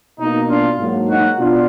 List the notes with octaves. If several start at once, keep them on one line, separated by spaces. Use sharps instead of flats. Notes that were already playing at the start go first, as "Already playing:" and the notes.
B2 A#3 D#4
D4 F4
G#2 F#3 A#3
D#4 F#4
B2 B3 D4 F4